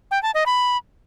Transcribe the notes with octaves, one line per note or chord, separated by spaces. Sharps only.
G5
A5
D#5
B5